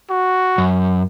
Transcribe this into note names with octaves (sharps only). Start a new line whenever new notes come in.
F#4
F#2